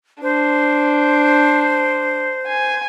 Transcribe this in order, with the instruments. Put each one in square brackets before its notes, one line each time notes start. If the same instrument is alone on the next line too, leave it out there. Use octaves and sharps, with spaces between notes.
[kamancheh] D4 [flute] C5
[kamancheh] G#5